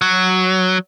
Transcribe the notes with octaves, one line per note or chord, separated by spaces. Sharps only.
F#3